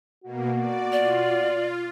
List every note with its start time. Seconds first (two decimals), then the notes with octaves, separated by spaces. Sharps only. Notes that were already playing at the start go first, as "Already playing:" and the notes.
0.24 B2 A#3 F#4
0.56 D5
0.92 F4 D5